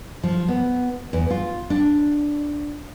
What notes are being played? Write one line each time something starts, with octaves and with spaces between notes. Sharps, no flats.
F3
B3
E2
F4
D4